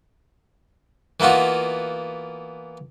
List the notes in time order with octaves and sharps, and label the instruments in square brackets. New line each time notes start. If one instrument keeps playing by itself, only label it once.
[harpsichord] E3 A#3 B3 F4 F#4